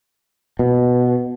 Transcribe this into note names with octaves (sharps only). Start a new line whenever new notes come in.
B2